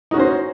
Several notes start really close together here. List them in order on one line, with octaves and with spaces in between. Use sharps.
D#4 F#4 C#4 C5